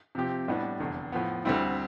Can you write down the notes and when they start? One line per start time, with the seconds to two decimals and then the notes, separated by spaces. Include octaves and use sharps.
0.15 C3 F3 C4 G4
0.48 A2 G3 B3 D4
0.79 F1 E2 D3
1.12 A2 F3 B3
1.45 D2 D3 G3 C4 E4